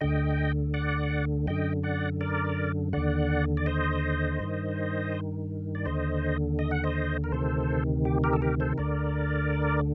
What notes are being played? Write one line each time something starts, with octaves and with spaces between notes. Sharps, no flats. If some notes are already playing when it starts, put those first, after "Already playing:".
D2 D3 D#5 G5
D5 F#5
F#2 D3 D#5 G5
D5 F#5
A#4 D5
D#2 D3 D5 F#5
D5
C5 D#5
G2 D#3
D5
D#2 D3 C5 D#5
D#5
F#5
C5 D#5
A#4
D2 C3 D#3 A4 C5
G4
G4 A#4
A4
G4 A#4
A4 C5
D2 D3 A#4 D5